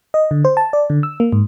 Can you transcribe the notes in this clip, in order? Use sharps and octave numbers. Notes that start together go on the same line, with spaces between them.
D#5
D3
C5
A5
D5
D3
E6
A#3
G#2